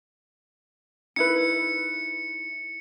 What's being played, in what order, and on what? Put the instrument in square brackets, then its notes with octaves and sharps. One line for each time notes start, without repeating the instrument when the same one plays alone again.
[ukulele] D#4 E4 B4 [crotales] C#7